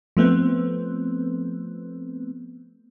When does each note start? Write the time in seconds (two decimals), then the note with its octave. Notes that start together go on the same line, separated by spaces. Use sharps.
0.17 F3 A3 B3 C4